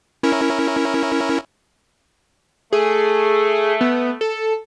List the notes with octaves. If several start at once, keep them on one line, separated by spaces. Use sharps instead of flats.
C#4 E4 A#4
A3 G#4
B3
A4